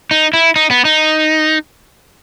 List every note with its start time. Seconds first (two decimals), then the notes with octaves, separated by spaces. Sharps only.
0.11 D#4
0.33 E4
0.56 D#4
0.71 B3
0.85 D#4